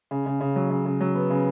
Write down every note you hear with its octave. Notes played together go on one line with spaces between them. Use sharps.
C#3
C#3
C#3
F#3
C#3
C#3
F#3
B3
C#3